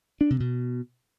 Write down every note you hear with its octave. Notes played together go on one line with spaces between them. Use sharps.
D4
C3
B2